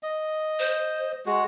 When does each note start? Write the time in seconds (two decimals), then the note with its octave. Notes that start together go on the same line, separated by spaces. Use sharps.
0.03 D#5
0.59 C5
1.26 G#3 F#4